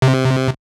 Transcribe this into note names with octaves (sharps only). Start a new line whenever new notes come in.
C3